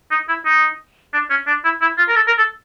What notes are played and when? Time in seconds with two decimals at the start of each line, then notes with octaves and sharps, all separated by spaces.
0.11 D#4
0.29 E4
0.45 D#4
1.14 D4
1.30 C#4
1.47 D4
1.64 E4
1.82 E4
1.98 F4
2.08 A#4
2.16 A4
2.27 A#4
2.38 A4